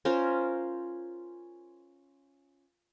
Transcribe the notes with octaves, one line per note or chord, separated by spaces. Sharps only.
C#4 F4 A#4 C5